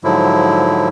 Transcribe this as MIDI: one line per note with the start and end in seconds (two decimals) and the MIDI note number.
0.04 0.88 44
0.04 0.88 50
0.04 0.88 53
0.04 0.88 54
0.04 0.88 64